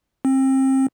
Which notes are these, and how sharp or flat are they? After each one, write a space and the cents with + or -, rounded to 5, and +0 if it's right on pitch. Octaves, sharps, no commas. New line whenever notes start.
C4 +30